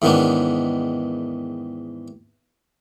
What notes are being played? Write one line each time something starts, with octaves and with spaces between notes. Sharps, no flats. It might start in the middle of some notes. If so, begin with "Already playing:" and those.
E2 G#2 D#3 B3 C#4 D4